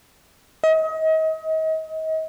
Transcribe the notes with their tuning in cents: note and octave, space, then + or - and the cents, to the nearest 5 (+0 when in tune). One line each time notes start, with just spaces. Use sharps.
D#5 +35